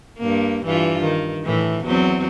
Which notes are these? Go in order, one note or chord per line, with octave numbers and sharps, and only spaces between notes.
G2 A#3
G2 E3 F4
D#3
A2 E3
E2 F#3 C4